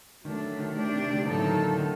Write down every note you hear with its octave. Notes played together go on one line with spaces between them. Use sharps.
D#3 F#3 A3 D4 A4
D#3
A3 D4 G4 D5
C3
D3
A2 D3 F#3 A#3 D#4 A4
D#3
D3
D#3